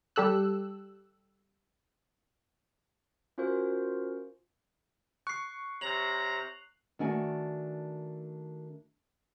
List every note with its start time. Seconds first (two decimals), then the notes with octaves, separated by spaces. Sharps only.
0.16 G3 G4 A4 E6 F#6
3.38 C#4 F4 F#4 A#4 C5
5.27 C#6 F#6 C7
5.81 C3 C#5 A#5 F7 F#7
6.99 D#3 A3 D4 F#4 D5 G#5